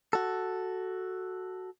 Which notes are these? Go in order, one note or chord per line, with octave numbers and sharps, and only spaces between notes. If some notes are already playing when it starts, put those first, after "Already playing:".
F#4 A4